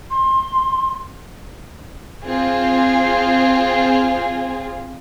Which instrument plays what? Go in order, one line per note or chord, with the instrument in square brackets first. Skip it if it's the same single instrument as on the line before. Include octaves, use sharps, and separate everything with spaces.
[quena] C6
[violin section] C4 F4 G#4